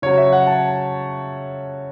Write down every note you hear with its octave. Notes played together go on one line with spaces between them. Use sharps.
C#3 F#3 C#5
E5
F#5
A5